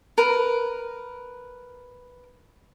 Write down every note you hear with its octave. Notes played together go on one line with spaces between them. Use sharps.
A#4 B4